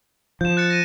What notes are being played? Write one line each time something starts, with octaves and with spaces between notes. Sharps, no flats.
F3 G6 E7
F#6 A6 C#7
A#6 D#7